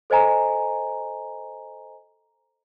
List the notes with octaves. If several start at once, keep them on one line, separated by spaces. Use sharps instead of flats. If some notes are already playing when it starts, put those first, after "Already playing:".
A4 C5 D#5 G#5 A#5